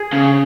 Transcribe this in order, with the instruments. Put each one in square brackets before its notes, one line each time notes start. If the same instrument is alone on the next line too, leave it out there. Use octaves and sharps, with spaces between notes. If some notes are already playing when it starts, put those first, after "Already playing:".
Already playing: [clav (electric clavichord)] G#4
[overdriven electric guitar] C#3